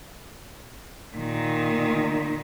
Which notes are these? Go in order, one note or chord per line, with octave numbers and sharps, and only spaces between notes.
A#2 D#3